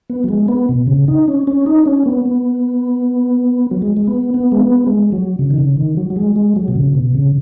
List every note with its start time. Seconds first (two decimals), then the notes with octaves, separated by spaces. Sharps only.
0.10 B3
0.24 F#3
0.29 G#3
0.48 B3
0.69 B2
0.87 C#3
1.08 D#4
1.28 C#4
1.47 C#4
1.66 D#4
1.86 C#4
2.06 B3
2.25 B3
3.71 F#3
3.82 G#3
3.97 G#3
4.07 B3
4.34 B3
4.52 G#3
4.61 B3
4.87 G#3
5.12 F#3
5.39 C#3
5.50 D#3
5.58 C#3
5.77 D#3
5.97 F#3
6.10 F#3
6.16 G#3
6.36 G#3
6.56 F#3
6.68 B2
6.75 C#3
6.95 B2
7.14 C#3